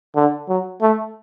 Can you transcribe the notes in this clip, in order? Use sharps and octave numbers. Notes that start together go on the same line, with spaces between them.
D3
F#3
A3